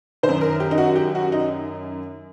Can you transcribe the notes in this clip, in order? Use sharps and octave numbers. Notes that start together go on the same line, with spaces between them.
D#3 C5
F#2
A#4
G4
D#4
F#4
G4
F#4
D#4